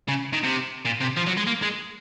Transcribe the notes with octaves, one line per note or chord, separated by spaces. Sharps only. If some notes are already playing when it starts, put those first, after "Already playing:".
C#3
D#3
C3
A#2
C3
F3
F#3
G#3
A#3
G#3